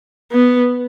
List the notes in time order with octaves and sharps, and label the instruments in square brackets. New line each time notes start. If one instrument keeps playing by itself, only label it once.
[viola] B3